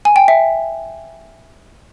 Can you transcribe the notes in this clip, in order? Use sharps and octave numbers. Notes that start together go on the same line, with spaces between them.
G#5
G5
E5